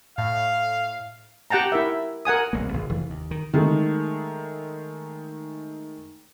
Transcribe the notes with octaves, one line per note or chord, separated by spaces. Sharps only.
A2 F5
G4 F#5 G5 A5 A#5
E4 A#4 E5
A#4 F#5 G#5 D#6
E1 C2 A#3
G#1
F1 E3
D#2
D#3
D#3 G#3 A3